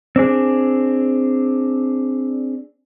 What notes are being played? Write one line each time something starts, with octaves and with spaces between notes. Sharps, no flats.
C4 D4 G#4